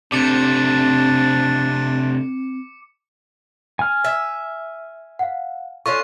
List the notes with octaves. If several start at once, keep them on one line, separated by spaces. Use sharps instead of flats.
C3 A3 C4 D4 D6 C#7
G#5 F6
E5
F5 F#5
C#4 D4 F4 A4 C#5 C#6